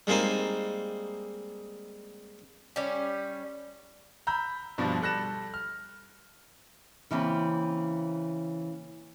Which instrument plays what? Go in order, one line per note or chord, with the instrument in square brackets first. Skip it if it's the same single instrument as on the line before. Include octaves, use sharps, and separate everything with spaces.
[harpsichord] G3 G#3 A#3 C4 D#4
[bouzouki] G3 C#4
[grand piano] A#5 B5 E6 G6
G2 B2 F3 G3 D4
G3 A4 F#6 A#6 E7
F6
[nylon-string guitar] C#3 E3 A#3 C4